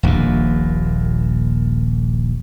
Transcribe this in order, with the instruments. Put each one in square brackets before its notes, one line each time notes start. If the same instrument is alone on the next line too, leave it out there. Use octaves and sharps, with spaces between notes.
[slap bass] D#1 A#1 D#2 A#2